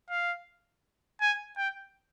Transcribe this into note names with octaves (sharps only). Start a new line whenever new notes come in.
F5
G#5
G5